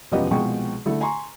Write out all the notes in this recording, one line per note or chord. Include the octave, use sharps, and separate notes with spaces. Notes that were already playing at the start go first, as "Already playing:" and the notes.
E1 F#2 F3 B3 G4 D#5
C2 B2 F3 G#3 G5 C#6
D3 A3 E4 A4
G#5 A#5 C6 C#6